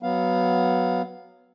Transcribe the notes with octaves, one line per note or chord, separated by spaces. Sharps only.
F#3 B3 F5